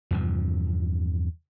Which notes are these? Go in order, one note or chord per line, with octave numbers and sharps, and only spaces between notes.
E2 G2 C3 F3